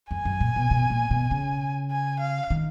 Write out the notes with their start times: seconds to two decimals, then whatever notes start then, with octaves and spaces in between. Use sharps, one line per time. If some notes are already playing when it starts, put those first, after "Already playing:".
0.11 F2 G#5
0.25 F#2
0.41 A#2
0.56 B2
0.71 B2
0.90 A#2
1.11 B2
1.31 C#3
1.91 G#5
2.20 F5
2.50 D#3